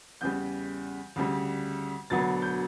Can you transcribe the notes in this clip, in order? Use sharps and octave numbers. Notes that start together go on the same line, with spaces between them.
E2 C#3 G3 G6
D2 C#3 G3
E1 D2 D3 F#3 B3 A6
G6